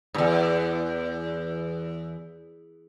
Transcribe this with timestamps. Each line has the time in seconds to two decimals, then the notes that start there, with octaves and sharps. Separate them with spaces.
0.14 E2 G#2